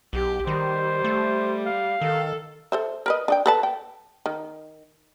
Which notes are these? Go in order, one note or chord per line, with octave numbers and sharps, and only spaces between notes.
B1 G4
D#3 G3 C5
A3
F5
D#3 A4
A4 C5 E5
A#4 B4 D#5
D4 D#5 G5
A4 B4 A5
G5
D#3